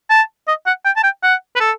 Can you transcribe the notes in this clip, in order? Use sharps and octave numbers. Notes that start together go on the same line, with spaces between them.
A5
D#5
F#5
G5
A5
G5
F#5
B4
A4